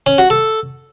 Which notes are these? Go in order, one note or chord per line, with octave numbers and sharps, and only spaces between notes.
C#4
F#4
A4